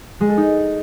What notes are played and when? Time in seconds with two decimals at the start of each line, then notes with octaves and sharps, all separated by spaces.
0.21 G#3
0.29 A4
0.37 D#4